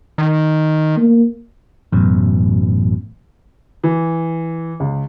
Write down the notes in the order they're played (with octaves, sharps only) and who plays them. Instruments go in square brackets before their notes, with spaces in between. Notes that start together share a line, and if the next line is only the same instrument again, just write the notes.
[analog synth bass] D#3
[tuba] A#3
[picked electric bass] A1 F#2 B2
[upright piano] E3
C#2